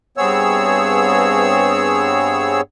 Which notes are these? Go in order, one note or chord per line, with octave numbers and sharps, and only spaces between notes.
G2 B3 C4 G#4 C#5 E6